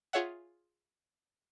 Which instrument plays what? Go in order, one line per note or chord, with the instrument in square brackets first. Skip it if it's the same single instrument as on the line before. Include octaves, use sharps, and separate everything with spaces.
[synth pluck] F4 G#4 C#5 E5 F#5